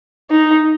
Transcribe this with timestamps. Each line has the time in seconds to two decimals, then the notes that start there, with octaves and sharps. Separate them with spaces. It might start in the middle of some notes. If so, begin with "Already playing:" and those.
0.30 D#4